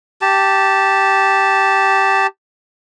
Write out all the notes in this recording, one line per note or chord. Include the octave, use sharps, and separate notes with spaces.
G4 A5